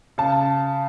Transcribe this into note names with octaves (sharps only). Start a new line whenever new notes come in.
C#3 A5